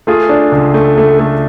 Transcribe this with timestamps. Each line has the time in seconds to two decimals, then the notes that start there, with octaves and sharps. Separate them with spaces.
0.07 A3 F4 G#4
0.29 D4
0.52 C#2
0.74 A3
0.98 A3
1.19 A3